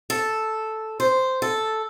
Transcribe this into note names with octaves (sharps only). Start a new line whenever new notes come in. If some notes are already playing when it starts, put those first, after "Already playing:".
A4
C5
A4